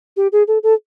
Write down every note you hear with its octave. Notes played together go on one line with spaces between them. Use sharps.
G4
G#4
A4
A4